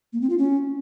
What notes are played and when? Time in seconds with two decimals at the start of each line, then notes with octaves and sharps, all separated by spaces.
0.13 A#3
0.21 C4
0.30 F4
0.38 C#4